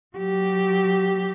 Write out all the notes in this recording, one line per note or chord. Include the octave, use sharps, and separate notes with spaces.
F#3 G4